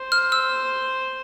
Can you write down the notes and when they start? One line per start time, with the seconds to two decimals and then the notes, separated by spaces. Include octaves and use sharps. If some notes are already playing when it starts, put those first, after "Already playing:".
Already playing: C5
0.12 F6
0.32 E6